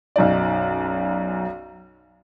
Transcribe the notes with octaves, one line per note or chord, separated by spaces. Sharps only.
B1 F#2 D#4 D5